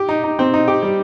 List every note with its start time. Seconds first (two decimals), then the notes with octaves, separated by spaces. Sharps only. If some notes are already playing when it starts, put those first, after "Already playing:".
Already playing: G4
0.09 D#4
0.24 D#4
0.39 C4
0.54 D#4
0.68 G4
0.82 G3